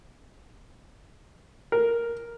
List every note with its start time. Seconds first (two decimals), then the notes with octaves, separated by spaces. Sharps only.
1.72 A#4